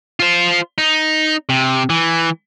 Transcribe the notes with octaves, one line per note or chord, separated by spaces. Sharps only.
F4 C5
D#4
C3
E3